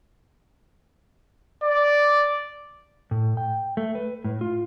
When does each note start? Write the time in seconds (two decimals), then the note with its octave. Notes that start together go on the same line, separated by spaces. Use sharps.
1.64 D5
3.11 A2
3.37 G5
3.77 A3
3.95 B4
4.24 A2
4.41 F4